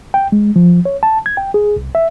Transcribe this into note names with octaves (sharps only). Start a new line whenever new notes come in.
G5
G#3
F3
C#5
A5
G#6
G5
G#4
C2
E5